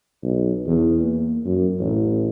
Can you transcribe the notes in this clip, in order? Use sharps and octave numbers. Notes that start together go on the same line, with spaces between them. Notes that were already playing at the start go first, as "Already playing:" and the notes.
B1
E2
A#3
F#2
A1